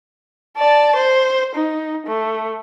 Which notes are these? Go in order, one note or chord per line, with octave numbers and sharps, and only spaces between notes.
D5 A5
C5
D#4
A3